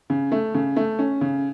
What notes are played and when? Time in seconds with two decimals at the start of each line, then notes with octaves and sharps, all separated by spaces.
0.10 C#3
0.32 A3
0.54 C#3
0.77 A3
0.99 C#4
1.21 C#3